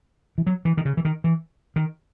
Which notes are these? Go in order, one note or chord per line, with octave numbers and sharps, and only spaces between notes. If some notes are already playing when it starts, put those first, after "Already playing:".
E3
F#3
E3
D#3
C#3
E3
D#3
E3
D#3